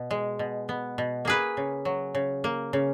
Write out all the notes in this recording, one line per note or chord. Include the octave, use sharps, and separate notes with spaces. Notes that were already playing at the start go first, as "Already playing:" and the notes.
Already playing: B2
G#3
B2
B3
B2
A#3 G#4 B4
C#3
F#3
C#3
A#3
C#3